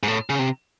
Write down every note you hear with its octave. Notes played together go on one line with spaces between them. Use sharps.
G#2
A2
C#3
C3